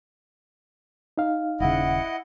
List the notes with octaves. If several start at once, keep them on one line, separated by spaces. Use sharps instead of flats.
D#4 F5
D#1 C#3 E4 D#5 F#5